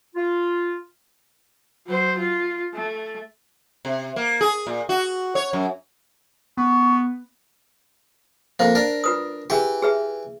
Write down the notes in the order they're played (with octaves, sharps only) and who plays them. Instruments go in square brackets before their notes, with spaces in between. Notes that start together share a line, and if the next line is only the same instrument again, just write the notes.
[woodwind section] F4
[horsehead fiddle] F#3 C5
F4
A3
[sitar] C3
A#3
G#4
A#2
F#4
C#5
F#2
[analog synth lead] B3 [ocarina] C#6
[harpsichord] F2 A#3 [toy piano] C5
[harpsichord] D4 A#4
[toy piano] F4 B4 D#6
[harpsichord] E3 G4 [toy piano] G#4
[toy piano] G#4 B4 E5